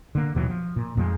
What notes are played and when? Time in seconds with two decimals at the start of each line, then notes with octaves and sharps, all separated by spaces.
0.15 D3 A#3
0.35 D#2 B2 E3 F#3
0.49 F3
0.76 A#2
0.97 F2 G#2 F3 G#3